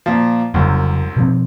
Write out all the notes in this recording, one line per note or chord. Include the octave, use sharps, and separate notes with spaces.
A#2 F3
F1 C2 F#2 C#3 F#3
B2 F3 C4